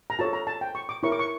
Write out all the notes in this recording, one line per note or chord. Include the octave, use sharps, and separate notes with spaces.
A#5
F4 A4 C#5 A5
A#5
A5
G5
C#6
D6
E4 A#4 C#5 C#6
D6
C#6